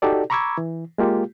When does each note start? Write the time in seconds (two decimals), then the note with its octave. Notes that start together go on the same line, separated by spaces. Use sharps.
0.02 D#4 F#4 G4 A4 D5
0.30 A#5 B5 C#6 D6 E6 G#6
0.58 E3
0.98 G#3 A#3 F4 G4